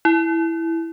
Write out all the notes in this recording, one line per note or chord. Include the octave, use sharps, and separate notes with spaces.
E4